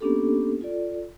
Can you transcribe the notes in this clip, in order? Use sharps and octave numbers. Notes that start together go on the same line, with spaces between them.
A#3 B3 C#4 D4 G4 A4
F4 A4 D5